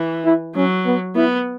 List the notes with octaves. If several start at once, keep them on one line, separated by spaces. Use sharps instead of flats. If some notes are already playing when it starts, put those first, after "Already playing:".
Already playing: E3
E4
F#3 C#4
B3
B3 E4